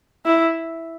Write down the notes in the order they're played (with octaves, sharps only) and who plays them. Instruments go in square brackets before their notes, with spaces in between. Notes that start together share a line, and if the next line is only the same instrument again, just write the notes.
[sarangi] E4